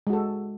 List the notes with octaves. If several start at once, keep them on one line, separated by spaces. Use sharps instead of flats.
G#3 F#4 A4